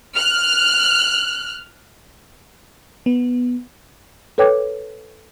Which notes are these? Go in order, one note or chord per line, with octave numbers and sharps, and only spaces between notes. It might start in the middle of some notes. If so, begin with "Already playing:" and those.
F6 F#6
B3
A4 B4 C#5 G5 D6 G#6